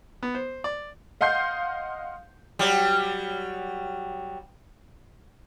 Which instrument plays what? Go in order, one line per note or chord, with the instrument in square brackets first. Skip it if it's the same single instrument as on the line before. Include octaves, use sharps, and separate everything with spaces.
[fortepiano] B3
C5
D5
[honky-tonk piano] D#5 F5 F#5 C6 G6 C7
[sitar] F#3 G3